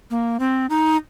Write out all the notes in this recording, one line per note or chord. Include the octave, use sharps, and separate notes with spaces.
A#3
C4
D#4